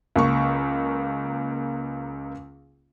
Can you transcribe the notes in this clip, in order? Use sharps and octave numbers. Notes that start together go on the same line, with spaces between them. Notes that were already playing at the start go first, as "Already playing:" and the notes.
C#2 A#3 C#6